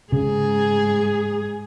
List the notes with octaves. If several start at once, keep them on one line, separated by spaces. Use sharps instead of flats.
G#2 C#3 G#4